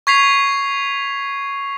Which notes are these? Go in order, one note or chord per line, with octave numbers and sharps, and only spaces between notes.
C#6 G#6 B6 C7 F7